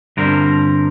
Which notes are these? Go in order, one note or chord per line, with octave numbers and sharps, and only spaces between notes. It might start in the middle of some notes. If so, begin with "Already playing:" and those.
G2 D3 G3 C4 A#4